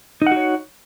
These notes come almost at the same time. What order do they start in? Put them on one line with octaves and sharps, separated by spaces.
D#4 F#5 F#4 C#5